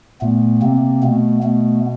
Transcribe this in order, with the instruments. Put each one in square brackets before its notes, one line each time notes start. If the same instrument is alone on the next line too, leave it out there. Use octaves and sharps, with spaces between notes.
[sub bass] A#2 [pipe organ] A3 B3
[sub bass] C3 [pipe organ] A#3 C4
[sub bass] B2 [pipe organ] A3 B3
[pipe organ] A3 B3